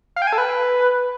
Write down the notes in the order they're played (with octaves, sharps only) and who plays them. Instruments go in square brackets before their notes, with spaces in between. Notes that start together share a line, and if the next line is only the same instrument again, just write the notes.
[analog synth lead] F5
G5
G#5
A4
B4